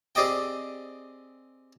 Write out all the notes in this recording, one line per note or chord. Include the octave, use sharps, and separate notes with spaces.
C4 G4 G#4 D5 D#5 G5